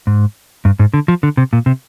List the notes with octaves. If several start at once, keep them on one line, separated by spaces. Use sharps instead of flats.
G#2
G2
G#2
D3
F3
D3
C3
A#2
C3